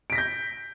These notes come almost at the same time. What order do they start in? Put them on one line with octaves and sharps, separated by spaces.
D7 B6 A#6 G6